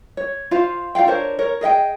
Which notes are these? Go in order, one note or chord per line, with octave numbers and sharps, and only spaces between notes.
C#5
F4 C5 F5
F4 D5 F5 G5
D4 A#4 C5 C#5
A#4 C#5
G#4 D#5 F5 G5